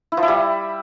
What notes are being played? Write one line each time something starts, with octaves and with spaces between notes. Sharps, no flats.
E4
F3
E4
G3